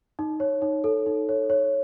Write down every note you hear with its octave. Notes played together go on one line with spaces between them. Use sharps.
D#4
C#5
D#4
A4
D#4
C#5
C#5